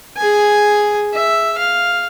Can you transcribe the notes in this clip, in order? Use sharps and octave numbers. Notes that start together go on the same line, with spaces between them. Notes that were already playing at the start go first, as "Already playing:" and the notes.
G#4 G#5
E5
F5